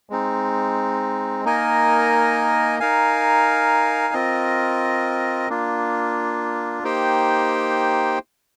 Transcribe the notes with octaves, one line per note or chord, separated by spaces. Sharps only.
G#3 C4 D#4
A#3 D#4 A#4 D#5 G#5
D#4 A#4 F5 G#5
C4 F4 A#4 D#5
A#3 D4 F4
A#3 D#4 G4 C5 G5